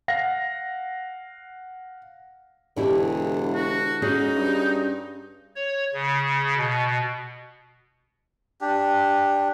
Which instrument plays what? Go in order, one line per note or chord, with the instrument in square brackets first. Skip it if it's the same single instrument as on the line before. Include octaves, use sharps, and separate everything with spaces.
[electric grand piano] F5 F#5 A#6
[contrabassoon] E1 [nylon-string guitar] D3 E4 G4
[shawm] F#4
[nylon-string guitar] C#4 F#4 G#4 [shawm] D#4
[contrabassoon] G2
[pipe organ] C#5
C#3
B2
[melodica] D4 G4